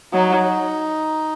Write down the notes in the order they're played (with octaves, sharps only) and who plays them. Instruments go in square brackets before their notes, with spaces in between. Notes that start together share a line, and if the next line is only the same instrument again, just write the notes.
[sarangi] F#3 [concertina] D#4